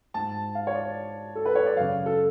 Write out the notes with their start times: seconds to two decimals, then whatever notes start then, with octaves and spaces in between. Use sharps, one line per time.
0.14 G#2 A5
0.55 F5
0.67 C#5
0.75 D5
1.35 A4
1.45 B4
1.55 C#5
1.66 D5
1.77 F#2 C#3 F5
2.06 A4